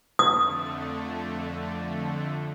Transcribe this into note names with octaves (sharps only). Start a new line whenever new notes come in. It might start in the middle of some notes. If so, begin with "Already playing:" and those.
F2 D3 A3 D#6